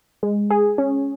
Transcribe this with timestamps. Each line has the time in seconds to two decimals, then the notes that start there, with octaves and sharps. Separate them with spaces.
0.23 G#3
0.51 G#4
0.78 C#4